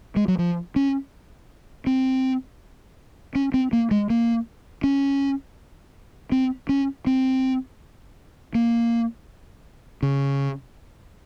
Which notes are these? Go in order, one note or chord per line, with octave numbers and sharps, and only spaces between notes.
G#3
F#3
F3
C#4
C4
C#4
C4
A#3
G#3
A#3
C#4
C4
C#4
C4
A#3
C#3